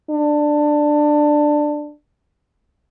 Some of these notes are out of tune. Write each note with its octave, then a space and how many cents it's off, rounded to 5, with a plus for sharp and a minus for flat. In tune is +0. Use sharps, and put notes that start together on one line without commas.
D4 +15